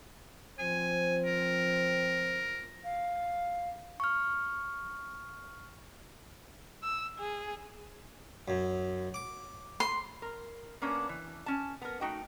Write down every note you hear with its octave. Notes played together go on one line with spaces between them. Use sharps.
F3 C4 C5 G#5
A#4
F5
C#6 F6
E6
G#4
F#2
D6
C6
A#4
A#3 B3 C#4 D4 A#4
E3
C#4 A5
B3 A#4
A3 D#4 F#4 G5